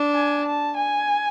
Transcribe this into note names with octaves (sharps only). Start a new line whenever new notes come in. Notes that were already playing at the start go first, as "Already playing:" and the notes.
Already playing: D4
G#5
A5
G#5